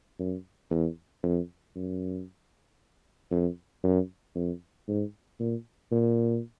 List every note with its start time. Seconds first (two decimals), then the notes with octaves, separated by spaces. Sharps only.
0.19 F#2
0.70 E2
1.23 F2
1.76 F#2
3.31 F2
3.83 F#2
4.35 F2
4.88 G#2
5.40 A#2
5.92 A#2